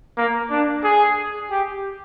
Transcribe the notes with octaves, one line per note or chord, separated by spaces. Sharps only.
A#3
D4
G#4
G4